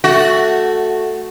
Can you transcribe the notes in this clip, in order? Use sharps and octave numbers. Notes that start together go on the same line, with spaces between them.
A3 F#4